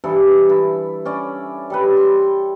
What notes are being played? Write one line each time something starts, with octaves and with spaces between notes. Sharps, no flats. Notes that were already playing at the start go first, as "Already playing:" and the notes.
G2 E3 A4
E4
C#4 D5
G3 A4 B4
C6